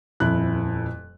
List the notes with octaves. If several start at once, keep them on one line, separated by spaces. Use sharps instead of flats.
D#1 F2 E4 F#6